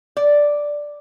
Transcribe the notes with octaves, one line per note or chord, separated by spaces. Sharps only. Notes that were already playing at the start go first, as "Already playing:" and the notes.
D5